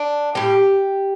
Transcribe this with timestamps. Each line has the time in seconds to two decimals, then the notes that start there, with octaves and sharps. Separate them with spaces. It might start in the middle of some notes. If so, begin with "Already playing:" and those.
Already playing: D4
0.35 A2 G3 G4